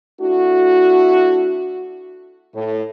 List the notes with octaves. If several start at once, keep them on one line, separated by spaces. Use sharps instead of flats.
A3 D4 E4 F#4
A2